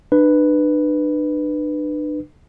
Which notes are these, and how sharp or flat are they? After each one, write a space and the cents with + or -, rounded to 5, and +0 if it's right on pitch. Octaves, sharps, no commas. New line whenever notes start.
D4 +40 B4 +0